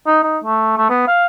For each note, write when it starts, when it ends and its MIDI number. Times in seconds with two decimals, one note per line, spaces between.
0.06 0.20 63
0.23 0.38 63
0.44 0.74 57
0.78 0.89 57
0.90 1.03 59
1.08 1.26 77